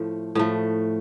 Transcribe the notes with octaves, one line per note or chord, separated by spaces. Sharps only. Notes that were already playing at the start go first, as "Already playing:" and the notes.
Already playing: A2 F3 A3
A2 F3 A3